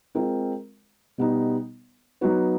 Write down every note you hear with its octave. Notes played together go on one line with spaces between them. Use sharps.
G#3 C4 F4 A#4
B2 G3 B3 D#4
F#3 B3 D#4 F#4 B4